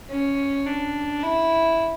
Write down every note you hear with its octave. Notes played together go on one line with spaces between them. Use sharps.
C#4
D4
E4